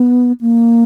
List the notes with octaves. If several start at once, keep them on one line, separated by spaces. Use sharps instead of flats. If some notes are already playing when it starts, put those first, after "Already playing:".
Already playing: B3
A#3